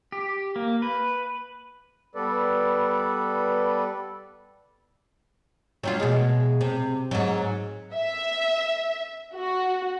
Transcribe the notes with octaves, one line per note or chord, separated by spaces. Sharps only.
G4
A#3
B4
G3 B3 A4 B4 D5
F#3 G3 F4
B2 G#3
C3
G#2 F#3
E5
F#4